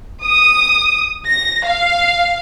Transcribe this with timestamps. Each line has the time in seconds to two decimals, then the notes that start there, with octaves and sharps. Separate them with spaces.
0.23 D#6
1.27 A#6
1.66 F5